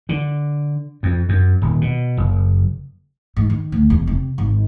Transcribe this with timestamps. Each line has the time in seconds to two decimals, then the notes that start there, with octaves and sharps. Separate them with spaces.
0.09 D3
1.03 F2
1.29 F#2
1.62 D#1
1.81 B2
2.17 F#1
3.37 G#2
3.50 D#3
3.72 D2
3.90 E1
4.07 C3
4.38 G#1